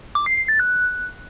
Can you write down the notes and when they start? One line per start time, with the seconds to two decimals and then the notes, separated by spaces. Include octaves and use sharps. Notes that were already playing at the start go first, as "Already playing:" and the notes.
0.15 D6
0.26 C7
0.37 C7
0.48 A6
0.60 F#6